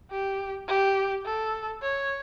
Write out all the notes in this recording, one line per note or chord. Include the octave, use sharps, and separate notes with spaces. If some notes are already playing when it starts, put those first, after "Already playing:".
G4
G4
A4
C#5